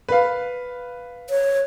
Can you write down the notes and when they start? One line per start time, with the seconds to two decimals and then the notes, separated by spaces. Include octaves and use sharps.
0.09 B4 F5
1.30 C#5